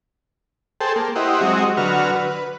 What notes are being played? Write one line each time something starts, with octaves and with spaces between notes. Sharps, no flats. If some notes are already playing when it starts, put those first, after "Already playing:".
G#4 A4 C5 G5 A5
A#3
E4 G4 C5 D#5 F#5
F#3 G#3 C4 F#4 D#5
D3 F#3 F#4 B4 F6
B4